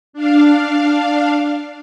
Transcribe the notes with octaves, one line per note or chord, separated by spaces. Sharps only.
D4 F5